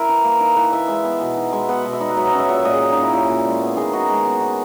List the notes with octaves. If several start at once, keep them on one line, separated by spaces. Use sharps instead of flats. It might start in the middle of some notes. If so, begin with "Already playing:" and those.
Already playing: E4 A#4
E3
A#3
D#4
E3 B4
E3 E5
G#3 E5
B3
B2
D#4
G#3 E5
B3 F#5
B2
E5
D#4 D#5
F#5
F#3 E5
D#5
C#4
E5
A#2 F#5
E5
A#2 D#5
G#4
F#3
C#4 D#4
E4
A#2 E4
A#2
G#3
B3
D#3 G#4
D#4 F#4
G#3
B3
D#3